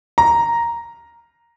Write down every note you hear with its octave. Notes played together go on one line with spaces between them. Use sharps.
A#5